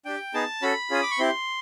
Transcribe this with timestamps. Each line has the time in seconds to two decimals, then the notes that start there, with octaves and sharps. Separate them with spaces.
0.05 D4 G4 G5
0.34 B3 D#4 G#4 A5
0.62 C#4 F#4 A4 B5
0.90 C#4 F4 G#4 D#6
1.03 D6
1.11 C#6
1.19 C4 E4 G4 C6